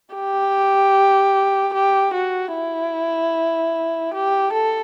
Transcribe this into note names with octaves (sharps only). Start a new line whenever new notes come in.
G4
G4
F#4
E4
G4
A4